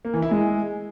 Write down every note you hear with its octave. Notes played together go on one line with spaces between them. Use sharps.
A#3
E3
E4
G#3